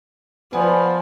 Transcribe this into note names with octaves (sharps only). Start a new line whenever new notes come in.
F3 B3 D5 G#5